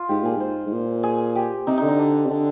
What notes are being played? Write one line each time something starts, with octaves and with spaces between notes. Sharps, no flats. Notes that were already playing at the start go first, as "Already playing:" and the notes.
Already playing: F4
G#2 G4
A#2 G#4
G#2 C5
G#2
A#2
G#4
G4
C3 D#4
D#4
D3
D#4
D4
C3
D3 D4